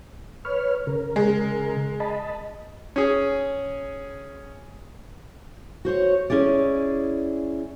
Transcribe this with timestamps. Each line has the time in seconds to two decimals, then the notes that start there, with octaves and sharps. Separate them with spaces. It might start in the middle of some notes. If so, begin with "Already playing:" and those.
0.45 B4 C#5 F6
0.87 C#3 A#4
1.16 G#3
2.00 D#5 A5 B5
2.96 C#4 G#4
5.85 F#4 C5 C#5
6.30 C#4 E4 G#4 D5